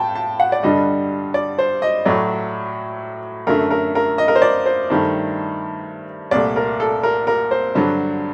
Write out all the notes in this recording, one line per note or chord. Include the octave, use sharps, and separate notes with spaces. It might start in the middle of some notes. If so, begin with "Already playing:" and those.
Already playing: A2 G5 A5
A5
F#5
D5
G2 D3 G3 D#5
D5
C5
D#5
A2 F#3 A3 D5
F#2 D3 A3 A#4
A#4
A#4
D#5
A#4
C5
D5
C5
G2 D#3 A3
C2 A#2 A3 D5
A#4
A4
A#4
A#4
C5
G2 D3 F#3